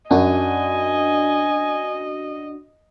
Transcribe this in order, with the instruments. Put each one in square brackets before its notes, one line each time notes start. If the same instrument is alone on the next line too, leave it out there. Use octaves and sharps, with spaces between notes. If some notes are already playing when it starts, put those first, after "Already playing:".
[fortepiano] F#2 [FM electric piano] D4 F#4 [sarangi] D#5 [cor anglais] G#5